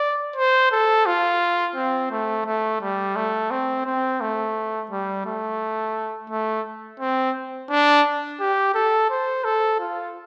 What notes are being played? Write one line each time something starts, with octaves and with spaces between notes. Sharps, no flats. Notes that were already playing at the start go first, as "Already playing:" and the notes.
Already playing: D5
C5
A4
F4
C4
A3
A3
G3
A3
C4
C4
A3
G3
A3
A3
C4
D4
G4
A4
C5
A4
F4